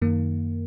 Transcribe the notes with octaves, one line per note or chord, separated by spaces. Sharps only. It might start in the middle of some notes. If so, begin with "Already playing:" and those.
F#2 D#3 A#3